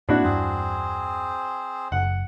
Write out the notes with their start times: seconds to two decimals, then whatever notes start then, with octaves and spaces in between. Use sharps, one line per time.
0.09 A2 A#3 C4 D4 E4 F#4 F#5
0.23 E2 G2 C4 G#4 C5
1.92 F#1 F#5